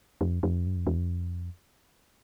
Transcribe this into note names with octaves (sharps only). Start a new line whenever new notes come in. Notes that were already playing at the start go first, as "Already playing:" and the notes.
F2
F2
F#2
F2
E2
F2